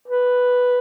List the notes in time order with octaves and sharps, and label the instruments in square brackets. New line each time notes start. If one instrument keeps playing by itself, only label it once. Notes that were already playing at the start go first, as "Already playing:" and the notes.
[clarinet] B4